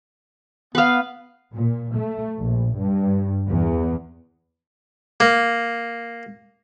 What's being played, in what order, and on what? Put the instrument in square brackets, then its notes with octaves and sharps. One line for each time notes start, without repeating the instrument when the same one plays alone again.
[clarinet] B3 [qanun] B4 F5
[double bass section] A#2
A3
A#1
G2
E2
[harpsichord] A#3